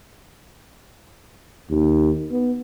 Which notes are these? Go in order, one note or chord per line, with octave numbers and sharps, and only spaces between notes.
D#2
B3